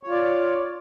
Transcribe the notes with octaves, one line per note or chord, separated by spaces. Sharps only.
F4 C#5 D5